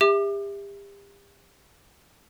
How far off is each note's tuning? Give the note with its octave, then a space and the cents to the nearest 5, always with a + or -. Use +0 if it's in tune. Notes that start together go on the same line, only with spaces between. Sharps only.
G4 +35 E5 -5 D6 +35